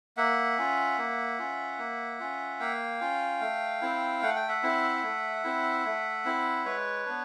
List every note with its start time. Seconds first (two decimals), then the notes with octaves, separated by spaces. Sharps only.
0.17 A#3 E5 F#5
0.58 C#4 F4
0.98 A#3
1.39 C#4 F4
1.79 A#3
2.20 C#4 F4
2.60 A#3 F5 G5
3.01 C#4 F4
3.41 A3
3.81 C4 E4
4.22 A3 F#5
4.36 G5
4.48 E5 F#5
4.63 C4 E4
5.03 A3
5.44 C4 E4
5.85 A3
6.25 C4 E4
6.65 G#3 B4 C#5
7.06 B3 D4